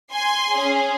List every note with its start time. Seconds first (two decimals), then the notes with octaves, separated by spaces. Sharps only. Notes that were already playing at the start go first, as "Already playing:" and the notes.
0.11 G#5 C6
0.48 G#4
0.53 C#4